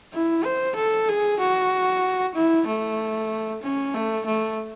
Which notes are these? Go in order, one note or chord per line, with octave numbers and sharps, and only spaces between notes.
E4
C5
A4
G#4
F#4
E4
A3
C#4
A3
A3